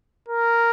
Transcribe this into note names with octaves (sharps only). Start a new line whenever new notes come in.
A#4